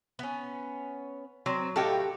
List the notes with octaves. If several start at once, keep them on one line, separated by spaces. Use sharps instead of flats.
B3 C#4
F#3 C4
A2 D#4 F#4 G4 A4 F5